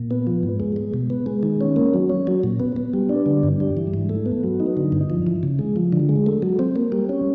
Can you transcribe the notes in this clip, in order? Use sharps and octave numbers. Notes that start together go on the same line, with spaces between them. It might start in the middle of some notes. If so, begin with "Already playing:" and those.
Already playing: A#2
B3
F3
G#2
G#3
G#3
B2
B3
G#3
D#3
C#4
A#3
F#3
C#4
F#3
A#2
B3
B3
G3
D4
D3
G2
G3
E3
G#2
A3
B3
F#3
D#4
D3
G2
F3
E3
C#3
G#3
F3
D3
G#3
A3
F#3
C4
A#3
G3
C#4